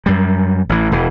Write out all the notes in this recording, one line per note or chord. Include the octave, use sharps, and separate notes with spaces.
F#2 G3
A1 E3
E1 E3